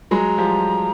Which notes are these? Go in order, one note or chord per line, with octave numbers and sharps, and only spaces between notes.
F#3 G#3 A#5 B5
F3 G3